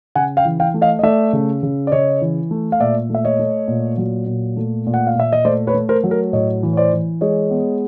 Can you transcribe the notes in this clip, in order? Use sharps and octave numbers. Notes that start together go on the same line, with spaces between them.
C#3 F#5 G#5
F5 G5
E3
F5 G5
A3
D#5 F5
D#5
A3 D5 E5
C#3
C#3
D5
C#3 C#5 D#5
E3
A3
F5
A#2 D5 E5
A3 E5
C#5 D#5
A3
A#2
F#3
A#2
A3
A#2
F#5
F5
A#2 E5
D#5
A3 C5 D5
B4 C#5
A3
A#4 C5
F#3
A#4
A2 C#5 D#5
E3
C#5
C5 D5
E3
G#3 C#5 D#5
B3